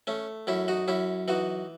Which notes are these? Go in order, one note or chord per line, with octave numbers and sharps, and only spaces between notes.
A3 C#4
F#2 C#4 E4
D#4 F#4
F#2 C#4 E4
E3 D#4 F#4